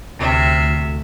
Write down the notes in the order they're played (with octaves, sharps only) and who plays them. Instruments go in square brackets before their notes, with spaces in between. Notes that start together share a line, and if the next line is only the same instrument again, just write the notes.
[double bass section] D2 [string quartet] C3 E5 F6